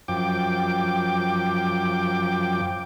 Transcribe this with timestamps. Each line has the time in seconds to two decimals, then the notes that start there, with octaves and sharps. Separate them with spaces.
0.08 F#2 F3 G5 D6